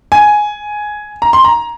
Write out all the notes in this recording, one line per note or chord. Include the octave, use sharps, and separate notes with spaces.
G#5
A#5
C6
A#5